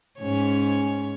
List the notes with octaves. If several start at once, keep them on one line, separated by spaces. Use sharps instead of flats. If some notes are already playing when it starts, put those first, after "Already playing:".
G#2 C#4 C#5